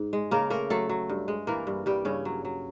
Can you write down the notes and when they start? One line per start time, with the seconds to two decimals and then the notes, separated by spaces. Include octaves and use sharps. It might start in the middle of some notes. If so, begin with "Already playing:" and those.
Already playing: G#2
0.13 G#3
0.31 C#3 A#3 A#4
0.50 A3 A#3 A#4
0.70 F#3 A3 A4
0.89 F#3
1.09 G2
1.28 G#3
1.47 E3 A#3 A#4
1.67 G2
1.86 G2 G3 G4
2.05 G2 C#3 C#4
2.25 F#3
2.45 F#3